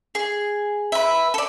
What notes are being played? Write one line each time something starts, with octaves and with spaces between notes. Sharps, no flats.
G#4
B4 E5
A4 D5